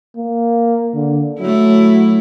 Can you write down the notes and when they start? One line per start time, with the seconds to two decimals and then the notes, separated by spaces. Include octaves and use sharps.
0.16 A#3
0.95 D3
1.40 F#3 A3 E4